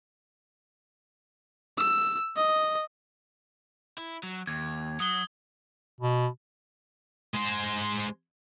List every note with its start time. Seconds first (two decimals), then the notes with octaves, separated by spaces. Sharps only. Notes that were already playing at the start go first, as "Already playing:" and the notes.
1.78 E6
2.36 D#5
3.98 E4
4.23 F#3
4.47 D#2 G#6
5.00 F#3 D#6 G7
6.01 B2
7.34 G#3 C5